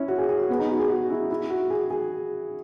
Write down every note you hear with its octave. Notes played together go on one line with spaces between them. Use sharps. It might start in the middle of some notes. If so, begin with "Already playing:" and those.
Already playing: C#4 E4
F#4
G#4
G#4
F#4
B3
D#4
F#4
G#4
F#4
E4
E4
F#4
G#4
G#4